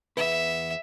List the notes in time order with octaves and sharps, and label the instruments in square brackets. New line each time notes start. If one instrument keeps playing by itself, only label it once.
[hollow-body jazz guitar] E2 B3 B4 [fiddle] E5